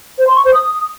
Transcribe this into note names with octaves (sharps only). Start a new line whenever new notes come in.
C5
C6
C#6
C5
D#6